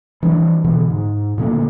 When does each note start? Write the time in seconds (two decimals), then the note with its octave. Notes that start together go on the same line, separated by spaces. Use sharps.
0.23 E3 G3 D4
0.64 B2 D3 E3
0.90 G#2
1.38 A#2 D3 A3 A#3